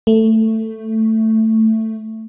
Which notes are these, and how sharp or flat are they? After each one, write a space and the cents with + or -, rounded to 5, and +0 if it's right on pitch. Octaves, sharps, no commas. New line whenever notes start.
A3 +10